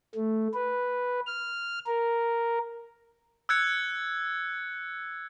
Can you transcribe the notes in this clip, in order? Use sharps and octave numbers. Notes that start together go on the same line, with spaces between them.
A3
B4
F6
A#4
E6 F#6 G#6 C#7